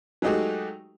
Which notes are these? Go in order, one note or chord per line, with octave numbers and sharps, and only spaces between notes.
F#3 G#3 A3 D#4 F#4 G4